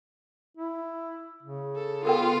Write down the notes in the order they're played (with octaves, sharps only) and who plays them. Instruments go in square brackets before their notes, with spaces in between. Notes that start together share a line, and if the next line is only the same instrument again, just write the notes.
[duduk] E4
C#3
[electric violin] A4
[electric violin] B3 F4 [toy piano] A4 A#4 G5